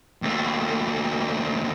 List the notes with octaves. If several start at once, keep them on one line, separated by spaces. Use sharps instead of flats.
D#2 A3